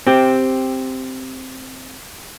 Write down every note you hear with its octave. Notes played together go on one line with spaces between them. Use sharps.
C4 G4